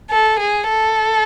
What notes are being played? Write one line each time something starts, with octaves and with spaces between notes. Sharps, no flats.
A4
G#4
A4